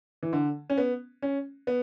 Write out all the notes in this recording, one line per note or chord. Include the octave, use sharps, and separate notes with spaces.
E3
D3
C#4
B3
C#4
B3